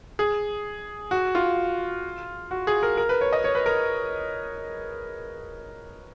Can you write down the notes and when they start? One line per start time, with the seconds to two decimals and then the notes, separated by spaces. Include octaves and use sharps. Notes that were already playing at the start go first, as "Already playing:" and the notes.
0.19 G#4
1.11 F#4
1.35 F4
2.51 F#4
2.67 G#4
2.83 A#4
2.97 A#4
3.09 B4
3.21 C#5
3.32 D#5
3.44 C#5
3.55 B4
3.66 A#4